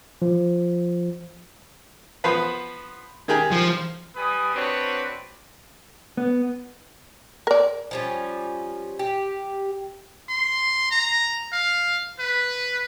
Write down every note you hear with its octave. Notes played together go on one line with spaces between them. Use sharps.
F3
F3 B3 B4
D#3 G4 G#4
F3
G3 B4 G#5 D#6
C4 D4 F#4 B4 C#5
B3
A#4 D5
F3 G3 C#4
G4
C6
A#5
F5
B4